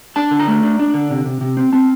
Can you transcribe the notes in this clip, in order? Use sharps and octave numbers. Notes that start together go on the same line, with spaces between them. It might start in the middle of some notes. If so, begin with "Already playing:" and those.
D4 A5
D3
A#5
A3
D4
D4
D3
C3
C3
C3
C4
C4 A5